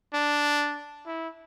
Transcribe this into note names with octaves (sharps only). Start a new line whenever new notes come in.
D4
E4